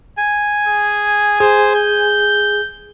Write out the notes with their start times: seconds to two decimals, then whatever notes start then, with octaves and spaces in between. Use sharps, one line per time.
0.18 G#5
0.68 G#4
1.40 G#4 C5
1.76 G6